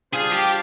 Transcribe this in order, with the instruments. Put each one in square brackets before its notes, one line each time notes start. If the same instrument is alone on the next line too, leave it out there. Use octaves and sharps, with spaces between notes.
[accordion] G3 D4 F4 C5 F5 [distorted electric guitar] G#4
[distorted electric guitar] G4